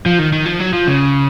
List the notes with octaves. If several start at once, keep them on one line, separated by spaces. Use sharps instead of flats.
F3
D#3
D#3
F3
F#3
F3
C#3